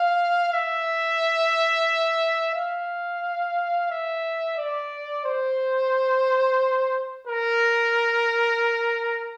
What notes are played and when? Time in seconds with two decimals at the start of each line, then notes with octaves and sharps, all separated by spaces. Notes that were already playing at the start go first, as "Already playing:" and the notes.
Already playing: F5
0.53 E5
2.55 F5
3.91 E5
4.58 D5
5.25 C5
7.27 A#4